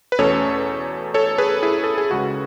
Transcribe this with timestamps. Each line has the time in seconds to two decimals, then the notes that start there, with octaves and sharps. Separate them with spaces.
0.12 B4
0.19 E2 B2 A3 C#4 A4 C#5
1.14 A4 C#5
1.38 G#4 B4
1.63 E4 G#4
1.84 A4
1.98 G#4
2.11 C#2 C#3 G#3 C#4 F#4